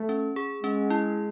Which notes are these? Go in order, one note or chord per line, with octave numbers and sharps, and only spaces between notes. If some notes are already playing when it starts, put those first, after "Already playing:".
Already playing: A3
C#4
G#4
G#3 C#4
E4